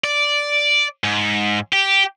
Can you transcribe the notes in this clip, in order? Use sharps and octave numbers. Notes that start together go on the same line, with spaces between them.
D5
G#2
G4